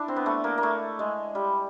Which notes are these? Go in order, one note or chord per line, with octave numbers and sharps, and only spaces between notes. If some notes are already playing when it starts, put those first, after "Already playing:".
Already playing: D4 E4
C4
B3
A3
A#3
A#3
A3
G#3
G3